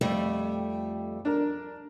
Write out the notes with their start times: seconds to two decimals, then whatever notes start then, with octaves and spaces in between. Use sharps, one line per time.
0.01 F2 G3 A3
1.25 D4 A#4